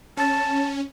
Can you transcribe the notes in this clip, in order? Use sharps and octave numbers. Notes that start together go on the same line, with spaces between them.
C#4 A5